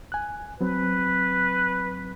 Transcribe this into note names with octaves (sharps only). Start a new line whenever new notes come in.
G#5 F#6
F#3 C4 B4